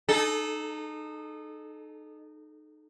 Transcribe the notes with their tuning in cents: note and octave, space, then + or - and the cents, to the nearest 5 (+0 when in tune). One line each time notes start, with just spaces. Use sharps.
D#4 -25 A4 -25